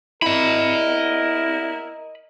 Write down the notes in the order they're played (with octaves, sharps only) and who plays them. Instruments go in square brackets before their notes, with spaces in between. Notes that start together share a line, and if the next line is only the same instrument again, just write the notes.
[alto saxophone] E4 [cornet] A#4 [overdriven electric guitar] D#5 B5